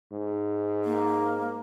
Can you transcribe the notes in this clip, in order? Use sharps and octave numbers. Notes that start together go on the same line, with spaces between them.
G#2
A#3